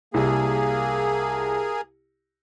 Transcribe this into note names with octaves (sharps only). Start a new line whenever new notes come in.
C2 A#3 G#4